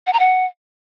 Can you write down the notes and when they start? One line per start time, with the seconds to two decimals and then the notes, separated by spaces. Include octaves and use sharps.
0.07 F#5
0.13 A#5
0.19 F#5